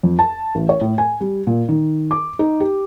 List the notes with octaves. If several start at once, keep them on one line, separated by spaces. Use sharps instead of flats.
F2
A5
A1
C#5
A2
G#5
G3
A#2
D#3
D6
D#4
G4